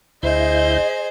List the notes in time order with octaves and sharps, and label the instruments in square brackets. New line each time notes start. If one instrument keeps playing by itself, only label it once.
[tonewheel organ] D2 E4 G6 [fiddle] G#4 C5 [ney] D#5